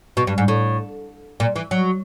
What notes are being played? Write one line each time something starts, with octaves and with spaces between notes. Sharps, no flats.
B2
G2
G#2
A2
A#2
E3
F#3